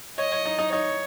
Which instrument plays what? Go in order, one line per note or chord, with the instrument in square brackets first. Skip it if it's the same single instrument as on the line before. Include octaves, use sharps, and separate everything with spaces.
[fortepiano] C#5 [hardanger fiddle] D#5
[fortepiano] C#5
D#4
D#4
[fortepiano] D#4 [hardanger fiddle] C#5